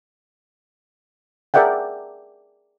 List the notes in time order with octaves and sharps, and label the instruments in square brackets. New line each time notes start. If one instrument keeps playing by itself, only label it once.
[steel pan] G#4 A#4 D5 E5 F#5 G5